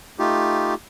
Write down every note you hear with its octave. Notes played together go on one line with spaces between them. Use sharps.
A3 D#4 F4 G4